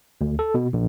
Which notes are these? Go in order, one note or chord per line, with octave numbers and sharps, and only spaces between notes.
D2
A4
B2
A#1